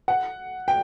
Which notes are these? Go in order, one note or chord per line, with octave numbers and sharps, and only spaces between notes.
F#5
G5